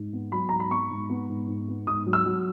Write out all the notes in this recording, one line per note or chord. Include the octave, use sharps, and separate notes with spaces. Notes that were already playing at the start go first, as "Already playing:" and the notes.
Already playing: G#2
B3
F#3 B5
G#2 A#5
B5
B3 C#6
G#2
B3
G#2
G#2
B3
G#2 D#6
F#3
E6
F#3